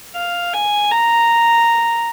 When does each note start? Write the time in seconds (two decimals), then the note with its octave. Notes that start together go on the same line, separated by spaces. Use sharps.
0.16 F5
0.54 G#5
0.92 A#5